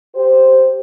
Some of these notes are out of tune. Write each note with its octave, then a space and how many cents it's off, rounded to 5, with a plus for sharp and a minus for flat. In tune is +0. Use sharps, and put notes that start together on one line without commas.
G4 +0 C5 +0